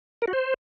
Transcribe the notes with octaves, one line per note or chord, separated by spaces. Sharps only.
A#4
F#4
C5